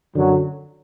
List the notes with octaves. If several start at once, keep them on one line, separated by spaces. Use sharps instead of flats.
F#2 D3 F#3